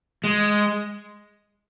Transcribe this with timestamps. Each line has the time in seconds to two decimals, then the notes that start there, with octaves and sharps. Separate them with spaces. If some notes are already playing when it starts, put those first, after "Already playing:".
0.24 G#3